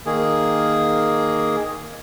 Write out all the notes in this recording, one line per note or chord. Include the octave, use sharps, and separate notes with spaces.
D#3 A#3 G#4